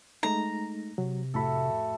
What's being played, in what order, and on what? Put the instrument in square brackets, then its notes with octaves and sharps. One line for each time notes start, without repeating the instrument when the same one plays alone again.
[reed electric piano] G#3 A3 D#4 [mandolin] A#5
[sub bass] C3 [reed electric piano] F#3
[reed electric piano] F2 A2 B5 [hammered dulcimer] A3 F#4 A4